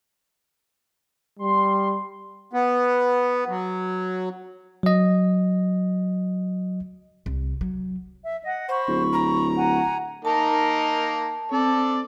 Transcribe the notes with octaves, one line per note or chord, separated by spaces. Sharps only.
G3 C6
B3
F#3
F#3 D#5
C2
F#3
E5
D#5 F#5
C5 B5 C#6
D1
A#5
F#5 G#5
A#3 D#4 A#4 A5
C4 A4 D5